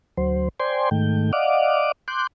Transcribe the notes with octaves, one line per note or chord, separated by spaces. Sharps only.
D2 F#3 C5
C5 D5 G5 G#5 C6
G#2 D#3 A3 G5
D5 D#5 F5 F#5 D6
C6 D6 F#6 G6